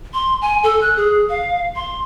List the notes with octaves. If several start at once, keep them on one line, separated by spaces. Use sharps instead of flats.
C6
G#5
A4
F#6
G#4
F5
C6